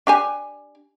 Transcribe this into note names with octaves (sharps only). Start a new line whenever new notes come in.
D4 G4 G#5